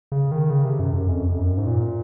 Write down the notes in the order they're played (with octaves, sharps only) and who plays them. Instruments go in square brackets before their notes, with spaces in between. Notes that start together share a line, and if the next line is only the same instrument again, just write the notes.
[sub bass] C#3
D#3
C#3
C3
F#2
F#2
F2
F2
F#2
G#2
A#2